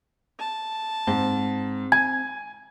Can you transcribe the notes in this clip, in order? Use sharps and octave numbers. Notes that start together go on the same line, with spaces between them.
A5
G#2 C4
G#5 G#6